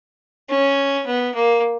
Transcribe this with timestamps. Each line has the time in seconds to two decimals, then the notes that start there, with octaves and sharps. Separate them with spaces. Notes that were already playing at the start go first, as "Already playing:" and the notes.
0.50 C#4
1.06 B3
1.35 A#3